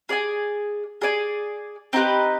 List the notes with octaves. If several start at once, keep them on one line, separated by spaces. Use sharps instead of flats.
G#4 D5 G#5
G#4 D5 G#5
C4 D#4 G4 B4